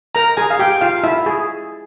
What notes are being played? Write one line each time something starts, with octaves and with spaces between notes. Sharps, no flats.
A#4 A#5
G#4 G#5
F5
G4 G5
F4 F5
E4 E5
G#4